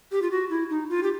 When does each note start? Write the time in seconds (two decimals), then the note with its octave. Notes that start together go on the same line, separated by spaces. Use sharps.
0.12 G4
0.22 F4
0.31 F#4
0.50 E4
0.70 D#4
0.89 F4
1.03 G4